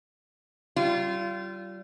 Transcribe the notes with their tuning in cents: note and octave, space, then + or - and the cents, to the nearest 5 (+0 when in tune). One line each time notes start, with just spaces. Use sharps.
G3 -30 F4 -20